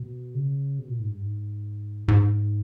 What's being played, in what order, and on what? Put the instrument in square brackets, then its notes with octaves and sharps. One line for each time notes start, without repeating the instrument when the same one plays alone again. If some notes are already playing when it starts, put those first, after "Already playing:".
Already playing: [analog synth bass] B2
C#3
B2
A#2
G#2
G2
G#2
G#2